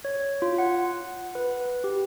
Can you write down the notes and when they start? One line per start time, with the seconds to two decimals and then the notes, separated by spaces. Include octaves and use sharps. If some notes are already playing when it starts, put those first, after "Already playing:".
0.05 C#5
0.42 F4
0.58 F#5
1.35 B4
1.84 G4